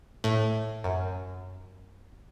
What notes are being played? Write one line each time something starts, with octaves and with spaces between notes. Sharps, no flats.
A2
F#2